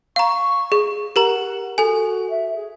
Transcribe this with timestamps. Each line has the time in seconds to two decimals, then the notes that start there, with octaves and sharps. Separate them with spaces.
0.16 F5 A#5 C#6
0.72 G#4
1.16 G4 A#4 F#5 A#5
1.78 F#4 A4 G#5
2.29 E5
2.55 G#4